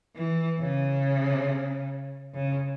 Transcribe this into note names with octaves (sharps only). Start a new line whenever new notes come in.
E3
C#3
C#3